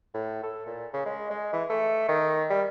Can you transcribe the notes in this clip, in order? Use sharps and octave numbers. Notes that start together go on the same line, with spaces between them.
A2
A4
A#2
C#3
G#3
G#3
E3
A3
D#3
G3